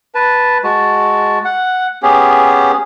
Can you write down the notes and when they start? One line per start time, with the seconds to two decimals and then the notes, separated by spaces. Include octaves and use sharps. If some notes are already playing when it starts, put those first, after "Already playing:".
0.15 B4 A5
0.64 G#3 F#4 A5
1.45 F#5
2.03 B3 C#4 G4 G#4